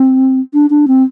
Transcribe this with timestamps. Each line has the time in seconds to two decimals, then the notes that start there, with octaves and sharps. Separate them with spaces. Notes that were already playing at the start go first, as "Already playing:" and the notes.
Already playing: C4
0.54 D4
0.70 D4
0.88 C4